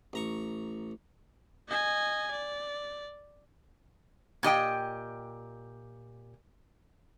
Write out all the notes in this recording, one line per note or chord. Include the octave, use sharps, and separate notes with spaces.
A1 A#5 C#6
D#5 G#5
D5
A#2 G4 D#5 G5